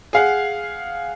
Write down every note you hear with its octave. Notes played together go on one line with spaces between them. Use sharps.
G#4 F5 F#5